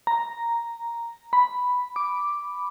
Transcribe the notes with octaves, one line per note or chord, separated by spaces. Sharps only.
A#5
B5
D6